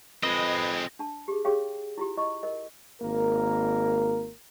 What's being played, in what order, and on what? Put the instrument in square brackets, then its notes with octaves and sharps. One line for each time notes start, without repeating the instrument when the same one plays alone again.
[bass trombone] F2 [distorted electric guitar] G#3 C4 [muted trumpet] B4 [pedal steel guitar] D#5
[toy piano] D4 A5
G4 G#4
G4 G#4 C#5 F5 G5
E4 F4 G4
E4 D#5 C#6
A#4 D#5
[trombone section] G#1 A#3 A#4